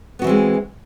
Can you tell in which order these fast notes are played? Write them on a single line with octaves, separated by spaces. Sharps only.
B3 F#4 E3 C4 G#3